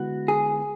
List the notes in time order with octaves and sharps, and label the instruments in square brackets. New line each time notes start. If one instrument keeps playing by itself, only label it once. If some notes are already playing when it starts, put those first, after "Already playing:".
Already playing: [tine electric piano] D3 G#3 B3 E4 B4 [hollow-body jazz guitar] F#4
[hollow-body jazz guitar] G#4